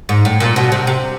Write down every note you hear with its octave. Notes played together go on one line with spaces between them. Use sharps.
G#2
A2
A#2
B2
C3
C3